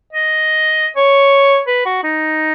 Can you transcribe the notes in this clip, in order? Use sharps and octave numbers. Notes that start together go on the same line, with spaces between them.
D#5
C#5
B4
F#4
D#4